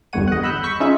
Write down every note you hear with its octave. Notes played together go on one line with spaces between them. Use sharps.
G1 E2 G2 C#5 F#5 D#7
D#5 F#5
B5 E6 F#6 G6
C#6 B6
C#4 D#4 F4 G#4 E5